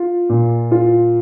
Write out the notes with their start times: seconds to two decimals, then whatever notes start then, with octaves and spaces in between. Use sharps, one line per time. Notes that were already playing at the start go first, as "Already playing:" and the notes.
Already playing: F4
0.29 A#2
0.71 F4